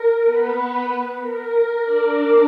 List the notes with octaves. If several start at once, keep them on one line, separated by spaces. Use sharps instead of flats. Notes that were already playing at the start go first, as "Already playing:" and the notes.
Already playing: A#4
B3 B4
A#4
D4 D5